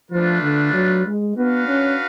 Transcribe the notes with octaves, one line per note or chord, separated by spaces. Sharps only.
F3 A3 D4 F4 B4
D3
F#3
G#3
B3 D4 F#4 B4 F5
C#4